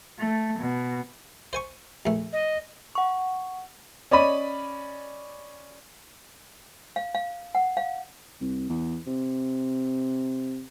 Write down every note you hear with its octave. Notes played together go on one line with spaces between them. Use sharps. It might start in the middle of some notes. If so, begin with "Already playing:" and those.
A3
B2
C5 G#5 C#6
A#1 A3
D#5
F#5 C#6
C#4 D5 D#5 B5 D#7
F5
F5
F#5
F5
C2
E2
C3